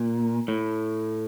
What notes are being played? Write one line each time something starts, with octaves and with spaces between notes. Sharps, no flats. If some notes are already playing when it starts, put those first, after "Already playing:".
Already playing: A#2
A2